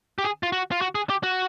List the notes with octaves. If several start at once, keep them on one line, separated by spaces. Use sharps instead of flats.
G4
G#4
F4
F#4
F4
F#4
G#4
G4
F#4